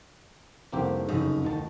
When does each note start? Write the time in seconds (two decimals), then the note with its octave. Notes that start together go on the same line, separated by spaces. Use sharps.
0.72 F1 C2 A#3 C4 G4
1.09 F#2 C#3 D#4
1.43 D2 D#3 A5